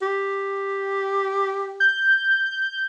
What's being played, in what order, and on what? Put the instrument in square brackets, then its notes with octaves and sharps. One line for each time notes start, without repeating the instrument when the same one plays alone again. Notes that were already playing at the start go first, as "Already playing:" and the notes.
[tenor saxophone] G4
[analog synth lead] G6